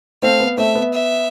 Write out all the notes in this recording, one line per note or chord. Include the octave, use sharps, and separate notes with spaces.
A3 C4 F5
B3
A3 C4 E5
B3
E5